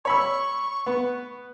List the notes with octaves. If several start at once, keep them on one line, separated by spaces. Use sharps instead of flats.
C#5 B5 C#6 E6
B3